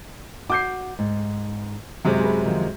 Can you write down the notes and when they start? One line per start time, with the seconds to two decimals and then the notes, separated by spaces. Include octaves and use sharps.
0.50 F#4 D6 G6 C7
0.99 G#2
2.05 F#2 C3 G#3
2.20 G#4 B4
2.46 D#3 F3